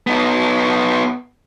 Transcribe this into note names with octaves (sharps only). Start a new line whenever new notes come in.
B3 D#4